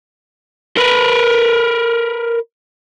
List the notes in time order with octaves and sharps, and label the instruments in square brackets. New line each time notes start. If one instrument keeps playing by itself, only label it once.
[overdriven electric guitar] A#4 B4